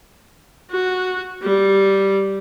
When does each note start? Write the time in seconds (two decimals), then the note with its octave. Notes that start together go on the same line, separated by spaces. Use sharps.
0.71 F#4
1.42 G3